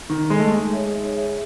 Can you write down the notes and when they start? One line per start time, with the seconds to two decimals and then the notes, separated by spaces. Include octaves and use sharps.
0.09 D#3 D#4
0.30 G#3 A4 D#5
0.40 A3
0.50 G#3 D#4
0.73 G#4 C#5 E5
0.94 D#4
1.15 G#4 C#5 E5